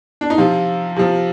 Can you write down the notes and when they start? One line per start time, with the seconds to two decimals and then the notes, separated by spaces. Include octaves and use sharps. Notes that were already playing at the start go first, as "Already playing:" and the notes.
0.21 D4
0.30 D#4
0.38 C3 F3 F4
0.96 C3 F3